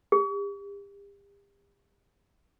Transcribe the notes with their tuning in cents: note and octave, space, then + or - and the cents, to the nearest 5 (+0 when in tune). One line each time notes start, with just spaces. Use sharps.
G4 +40